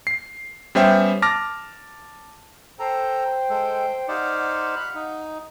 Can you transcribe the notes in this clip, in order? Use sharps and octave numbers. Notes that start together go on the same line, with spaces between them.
C7
G3 B3 C#4 C5 E5 G5
A5 D6 F6 A#6
A4 C5 G5 A#5
G#3 A4
D#4 G4 C5 D5 F5 F#5
B5 F#6
D#4